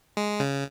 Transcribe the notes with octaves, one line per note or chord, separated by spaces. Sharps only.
G#3
C#3